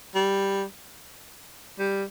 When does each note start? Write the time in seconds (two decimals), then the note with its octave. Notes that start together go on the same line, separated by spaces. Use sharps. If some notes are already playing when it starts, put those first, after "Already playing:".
0.15 G3
1.79 G3